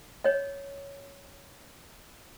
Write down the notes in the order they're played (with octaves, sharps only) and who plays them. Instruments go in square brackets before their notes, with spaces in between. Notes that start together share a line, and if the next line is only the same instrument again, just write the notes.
[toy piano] C#5 D#5